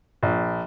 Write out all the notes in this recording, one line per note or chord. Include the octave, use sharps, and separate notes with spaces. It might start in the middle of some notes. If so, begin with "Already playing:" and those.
A#1